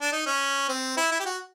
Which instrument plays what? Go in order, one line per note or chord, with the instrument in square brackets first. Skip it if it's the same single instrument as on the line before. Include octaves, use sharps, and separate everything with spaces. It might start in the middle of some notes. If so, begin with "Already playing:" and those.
[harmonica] D4
D#4
C#4
C4
E4
E4
G4
F#4